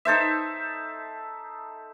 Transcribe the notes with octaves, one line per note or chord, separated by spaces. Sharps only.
D#4 A4 C5 E5